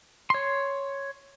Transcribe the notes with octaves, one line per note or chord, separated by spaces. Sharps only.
C#5 C6